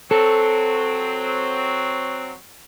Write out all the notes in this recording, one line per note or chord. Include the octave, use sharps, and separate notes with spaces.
F#3 C4 A4